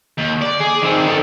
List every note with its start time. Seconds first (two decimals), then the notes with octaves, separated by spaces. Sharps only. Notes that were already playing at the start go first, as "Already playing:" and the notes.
0.18 D#2
0.41 D5
0.60 G#4
0.82 D#3 C4
1.07 D#3 A4